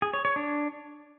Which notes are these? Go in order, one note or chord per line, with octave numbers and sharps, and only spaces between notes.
G#4
C#5
C#5
D4